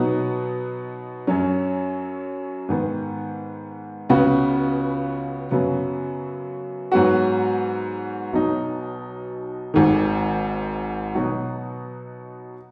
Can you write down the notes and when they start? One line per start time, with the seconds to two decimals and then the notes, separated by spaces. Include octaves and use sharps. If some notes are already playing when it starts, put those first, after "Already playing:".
Already playing: B2 F#3 B3 D#4 F#4
1.27 F#2 F#3 C#4
2.69 G#2 D#3 B3
4.09 C#2 C#3 B3 F#4
5.51 F#2 C#3 F#3 B3
6.92 G#2 F#3 B3 F#4
8.33 B1 B2 F#3 D#4
9.74 G#1 G#2 D#3
11.15 B2 F#3 D#4 F#4